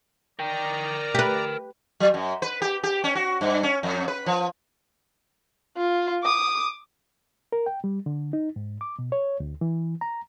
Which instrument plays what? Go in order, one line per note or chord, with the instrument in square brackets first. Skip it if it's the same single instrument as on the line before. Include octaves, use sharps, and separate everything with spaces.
[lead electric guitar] A#4 G5 [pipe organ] D5 A#5
[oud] G4 B4
[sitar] F#3
F#2
B4
G4
G4
C#4
F#4
G2
C#4
F2
B4
F3
[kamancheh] F4
D6 D#6
[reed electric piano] A#4
G5
G3
D3
D#4
G#2
D6
B2
C#5
D2
E3
A#5